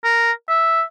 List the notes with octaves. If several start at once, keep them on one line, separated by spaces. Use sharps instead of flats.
A#4
E5